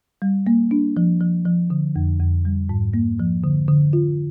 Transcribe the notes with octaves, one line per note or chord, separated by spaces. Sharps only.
G3
A#3
D4
F3
F3
F3
D3
F2
F2
G3
G#2
A#3
F3
D3
D3
F4